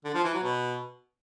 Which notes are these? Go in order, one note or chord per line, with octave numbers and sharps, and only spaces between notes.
D3
F3
E3
F#3
B2